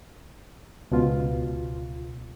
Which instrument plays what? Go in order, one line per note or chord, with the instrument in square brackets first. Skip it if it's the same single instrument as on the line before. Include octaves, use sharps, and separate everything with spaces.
[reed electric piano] C#2 B2 F4